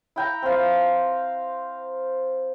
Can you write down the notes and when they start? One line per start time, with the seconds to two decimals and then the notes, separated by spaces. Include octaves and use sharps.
0.16 E4 G5 A#5
0.43 C4 F5